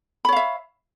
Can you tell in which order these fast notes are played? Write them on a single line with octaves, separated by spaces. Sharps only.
B5 C#5 F5 E5